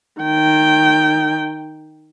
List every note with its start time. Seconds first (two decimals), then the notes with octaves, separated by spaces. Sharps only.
0.21 D#3 G5